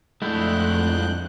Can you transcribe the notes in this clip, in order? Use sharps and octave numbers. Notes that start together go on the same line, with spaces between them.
F2 G#3 A3 D4 E4 F#5 G5 F#6